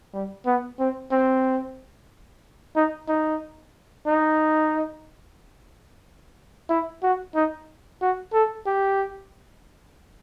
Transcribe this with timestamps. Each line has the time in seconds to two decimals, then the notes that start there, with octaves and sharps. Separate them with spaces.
0.13 G3
0.46 B3
0.79 C4
1.12 C4
2.76 D#4
3.08 D#4
4.07 D#4
6.69 E4
7.02 F#4
7.35 D#4
8.01 F#4
8.33 A4
8.66 G4